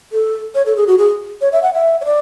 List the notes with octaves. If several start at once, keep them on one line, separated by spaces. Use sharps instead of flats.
A4
C#5
A4
G#4
F#4
G#4
C#5
E5
F#5
E5
C#5
D5